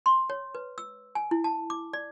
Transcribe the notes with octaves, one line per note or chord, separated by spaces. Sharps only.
C6
C#5
B4
E6
G#5
E4
A5
D6
D5